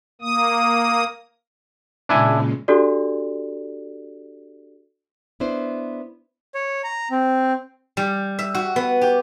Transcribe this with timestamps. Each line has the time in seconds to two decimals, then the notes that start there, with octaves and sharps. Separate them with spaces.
0.22 A#3 D#6
2.09 A#2 C#3 G#3 D4 E4 G#5
2.68 D4 F#4 G4 A4 D5
5.40 B3 D4 E4 C5
6.55 C#5
6.84 A#5
7.11 C4
7.97 G3
8.39 E5
8.55 F#4
8.76 B3
9.01 G4